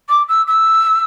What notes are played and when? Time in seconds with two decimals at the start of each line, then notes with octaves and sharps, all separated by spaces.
0.09 D6
0.28 E6
0.47 E6